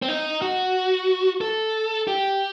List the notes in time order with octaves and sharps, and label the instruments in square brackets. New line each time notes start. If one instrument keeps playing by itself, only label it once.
[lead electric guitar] C4
D#4
F#4
A4
G4